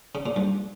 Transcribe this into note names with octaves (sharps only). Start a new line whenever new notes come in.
C#3
A#2
G2